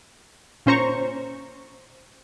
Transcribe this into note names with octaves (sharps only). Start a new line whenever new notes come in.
A#2 C#4 C5 A#5 C#6